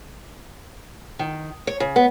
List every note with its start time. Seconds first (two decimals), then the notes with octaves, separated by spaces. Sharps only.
1.19 D#3
1.67 C#5
1.80 C#3
1.96 B3